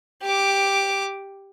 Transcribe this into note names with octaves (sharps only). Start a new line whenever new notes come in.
G4 D6